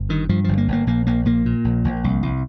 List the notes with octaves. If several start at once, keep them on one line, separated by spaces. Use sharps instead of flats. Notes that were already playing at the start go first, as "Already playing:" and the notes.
Already playing: G1
G2 D#3
G2 F3
G1 F3
A#3
G1 A#3
A#1 A#3
A#1 A#3
A#2 A#3
A#2
A#1
A#1
C2
C2